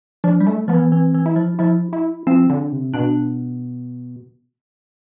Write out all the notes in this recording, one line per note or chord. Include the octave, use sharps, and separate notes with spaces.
F3 D4
G3
A3
F3 B3
E3
E3 C4
E3
E4
F3
F3 E4
E4
F3 C4
D3
C3
B2 D4